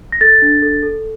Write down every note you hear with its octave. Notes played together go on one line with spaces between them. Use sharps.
A#6
A4 A6
D4
A4
A4